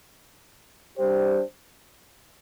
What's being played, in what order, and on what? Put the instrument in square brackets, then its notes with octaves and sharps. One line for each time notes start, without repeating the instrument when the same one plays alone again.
[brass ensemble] G3 D4 G4 C5